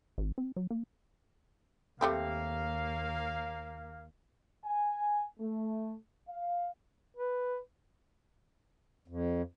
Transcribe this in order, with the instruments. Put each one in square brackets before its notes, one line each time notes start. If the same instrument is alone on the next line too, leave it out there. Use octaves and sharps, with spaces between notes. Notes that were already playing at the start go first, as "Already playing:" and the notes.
[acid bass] G#1
C4
F#3
A#3
[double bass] D#2 [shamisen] G3 A3 C4 [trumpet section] A#3 F5
[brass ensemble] G#5
A3
F5
[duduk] B4
[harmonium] F2